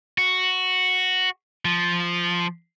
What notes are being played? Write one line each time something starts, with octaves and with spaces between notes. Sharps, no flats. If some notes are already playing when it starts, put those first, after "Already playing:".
F#4
F3